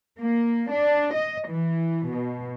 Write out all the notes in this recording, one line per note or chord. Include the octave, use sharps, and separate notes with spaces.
A#3
D4
D#5
E3
B2